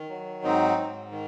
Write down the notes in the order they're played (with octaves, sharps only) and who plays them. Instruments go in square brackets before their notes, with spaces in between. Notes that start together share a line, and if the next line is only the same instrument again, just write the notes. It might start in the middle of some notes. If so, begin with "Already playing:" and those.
Already playing: [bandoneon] D#3
F#3
G#2 C4 D#4
G#2
D#3